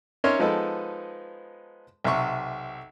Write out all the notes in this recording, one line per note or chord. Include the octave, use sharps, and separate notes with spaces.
C#4 D#4 A#4 C#5 E5 C6
F3 G#3 B3 D#4 A4 B4
B1 C3 E5 C#6